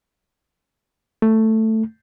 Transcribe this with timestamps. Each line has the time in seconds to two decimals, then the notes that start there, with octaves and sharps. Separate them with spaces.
1.22 A3